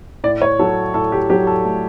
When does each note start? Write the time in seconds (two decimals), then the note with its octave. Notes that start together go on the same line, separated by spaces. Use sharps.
0.24 A2 D5
0.42 C#5
0.59 F#3 A4
0.94 A2 A4
1.12 G4
1.30 F#3 G4
1.47 A4
1.65 A3